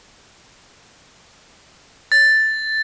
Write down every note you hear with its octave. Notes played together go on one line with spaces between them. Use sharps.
A6